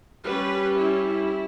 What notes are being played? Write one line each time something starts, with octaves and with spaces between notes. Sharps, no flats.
G3 C#4 B4
E4